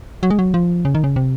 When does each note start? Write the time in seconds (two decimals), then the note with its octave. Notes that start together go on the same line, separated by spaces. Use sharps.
0.23 F#3
0.30 G#3
0.39 F#3
0.54 F3
0.85 C#3
0.95 D#3
1.04 C#3
1.16 C3